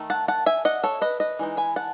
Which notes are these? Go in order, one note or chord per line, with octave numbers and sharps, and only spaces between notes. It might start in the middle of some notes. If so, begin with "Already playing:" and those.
Already playing: D#3 A3
F#5 A5
F#5 A5
E5 G#5
D#5 F#5
A4 C#5
B4 D#5
B4 D#5
E3 G#3 D#4
G#5 B5
F#5 A5